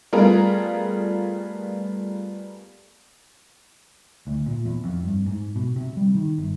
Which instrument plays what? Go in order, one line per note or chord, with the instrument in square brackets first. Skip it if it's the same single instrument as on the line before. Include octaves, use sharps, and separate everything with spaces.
[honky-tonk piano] G3 A3 B3 F4 G#4 A#4
[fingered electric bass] D2
A#2
E2
F2
G2
G#2
B2
C3
G3
D#3
G1